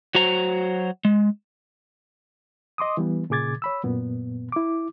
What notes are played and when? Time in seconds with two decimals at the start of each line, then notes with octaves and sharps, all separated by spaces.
0.15 F#3 F#4 C5 A#5
1.05 G#3
2.78 D#5 C6 D6 D#6
2.97 E3 G3 B3
3.30 A#2 C#3 G#4 D6 G#6 A6
3.62 C#5 B5 E6
3.84 F#2 A#2 B3
4.52 E4 D6